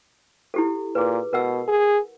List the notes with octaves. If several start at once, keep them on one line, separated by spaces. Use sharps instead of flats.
E4 G4 A4
A#2 G#4 B4
B2 A#4 F#5 E6
G#4